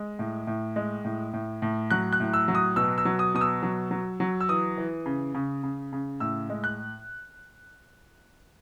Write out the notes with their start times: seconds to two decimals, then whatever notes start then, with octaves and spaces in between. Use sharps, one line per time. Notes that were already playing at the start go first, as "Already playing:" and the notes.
Already playing: G#3
0.19 A2
0.47 A2
0.76 G#3
1.05 A2
1.34 A2
1.62 A2
1.90 F#3 F#6
2.13 F#6
2.20 A2
2.33 E6
2.48 F#3
2.55 D#6
2.76 B2 E6
2.98 E6
3.05 F#3
3.19 D#6
3.34 B2 D#6
3.41 E6
3.63 F#3
3.91 F#3
4.20 F#3
4.40 E6
4.49 E3 D#6
4.78 E3
5.06 C#3
5.34 C#3
5.63 C#3
5.93 C#3
6.20 A2 E6
6.49 G#3
6.64 F#6